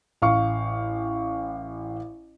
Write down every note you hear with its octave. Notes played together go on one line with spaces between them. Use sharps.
A1 F5 C#6